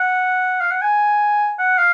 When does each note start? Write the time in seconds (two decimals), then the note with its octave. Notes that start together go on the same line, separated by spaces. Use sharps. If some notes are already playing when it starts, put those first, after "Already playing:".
Already playing: F#5
0.61 F5
0.71 F#5
0.82 G#5
1.59 F#5
1.78 F5